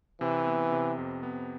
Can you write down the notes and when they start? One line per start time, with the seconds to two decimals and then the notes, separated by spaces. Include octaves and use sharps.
0.21 C3 E3
0.47 B3
0.72 C3
0.98 F2
1.23 B3